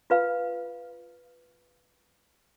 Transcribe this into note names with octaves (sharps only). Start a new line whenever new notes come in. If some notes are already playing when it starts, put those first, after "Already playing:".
F4 B4 F5